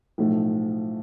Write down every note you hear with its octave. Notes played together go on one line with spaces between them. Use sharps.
B1 A2 F3 A3